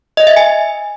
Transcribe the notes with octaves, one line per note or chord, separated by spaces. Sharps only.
D#5
E5
G#5